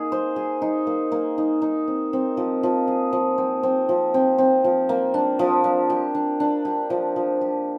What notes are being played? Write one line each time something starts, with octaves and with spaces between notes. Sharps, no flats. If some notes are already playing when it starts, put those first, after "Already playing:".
Already playing: A#3 D#4 G#4
C5
G#4
D#4
A#3
A#3
D#4
D#4
C4
C4
F3
F3
G#4
F3
C4
C4
F3
C4
C4
F3
A#3
D4
F3
D4
G4
D4
D4
G4
F3
F3
G4